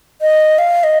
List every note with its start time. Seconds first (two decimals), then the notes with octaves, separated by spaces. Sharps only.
0.22 D#5
0.58 F5
0.84 D#5